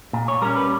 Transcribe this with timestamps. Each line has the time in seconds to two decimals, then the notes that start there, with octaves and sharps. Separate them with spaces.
0.13 A#2
0.28 C#5
0.42 G3 C#4 A#4
0.56 B4